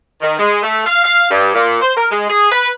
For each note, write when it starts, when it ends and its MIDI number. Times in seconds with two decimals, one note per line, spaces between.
0.21 0.35 51
0.39 0.58 56
0.63 0.84 57
0.86 1.01 77
1.05 1.27 77
1.30 1.54 43
1.54 1.78 46
1.81 1.92 72
1.97 2.06 70
2.11 2.28 56
2.29 2.51 68
2.52 2.69 71